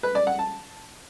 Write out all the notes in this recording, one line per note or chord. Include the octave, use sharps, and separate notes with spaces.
B4
D5
F#5
A5